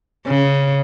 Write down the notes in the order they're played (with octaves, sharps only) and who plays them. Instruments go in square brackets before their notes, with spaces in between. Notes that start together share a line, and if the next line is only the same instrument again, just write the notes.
[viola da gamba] C#3